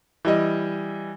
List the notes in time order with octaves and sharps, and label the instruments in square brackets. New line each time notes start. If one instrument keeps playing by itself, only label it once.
[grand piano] E3 G3 D#5